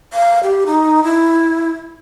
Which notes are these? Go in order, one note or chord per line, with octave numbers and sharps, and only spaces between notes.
F5
G4
D#4
E4